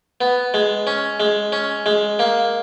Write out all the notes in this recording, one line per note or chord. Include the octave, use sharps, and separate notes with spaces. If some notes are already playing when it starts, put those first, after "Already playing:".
B3
G#3
C#4
G#3
C#4
G#3
A#3